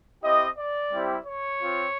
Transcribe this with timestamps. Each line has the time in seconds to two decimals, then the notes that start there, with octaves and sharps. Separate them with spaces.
0.23 C4 E4 G4 D#5
0.58 D5
0.91 G3 C4 E4 G4
1.26 C#5
1.61 C4 F4